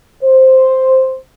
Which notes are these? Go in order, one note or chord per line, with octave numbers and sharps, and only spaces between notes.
C5